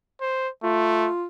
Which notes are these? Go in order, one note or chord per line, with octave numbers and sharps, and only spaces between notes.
C5
A3 F4